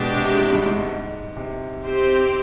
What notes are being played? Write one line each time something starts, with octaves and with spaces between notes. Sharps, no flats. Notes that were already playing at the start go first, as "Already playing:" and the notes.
Already playing: B2 G#3 D4 G4
C3
G#2
G2
G#2
C3
C4 G4 C5